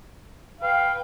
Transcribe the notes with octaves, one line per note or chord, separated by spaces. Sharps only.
B4 F5 G5